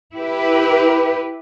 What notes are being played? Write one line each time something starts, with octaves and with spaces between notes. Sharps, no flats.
E4 G4 B4